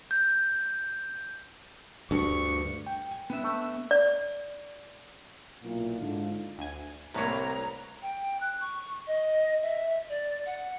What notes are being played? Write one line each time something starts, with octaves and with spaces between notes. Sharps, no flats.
G6
D2 G2 C#6
G5
G#5
B3 D4 E5
A3
D5
B1 A#2 E4 F4
G#2 D3
D2 G#5
C2 A2 A#3 B4 C#5 A#5
G5
F#6
C#6
D#5
E5
D5
F#5